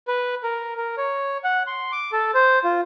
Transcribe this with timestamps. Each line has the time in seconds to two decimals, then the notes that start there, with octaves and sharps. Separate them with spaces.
0.08 B4
0.43 A#4
0.77 A#4
0.97 C#5
1.44 F#5
1.67 C6
1.92 D6
2.12 A4
2.34 C5
2.64 F4